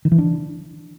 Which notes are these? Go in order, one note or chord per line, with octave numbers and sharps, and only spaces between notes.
D#3
E3
D4